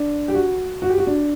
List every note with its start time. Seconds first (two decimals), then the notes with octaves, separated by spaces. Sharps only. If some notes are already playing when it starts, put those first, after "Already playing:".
Already playing: D4
0.28 G4
0.34 F#4
0.82 F#4
0.90 G4
0.98 F#4
1.07 D4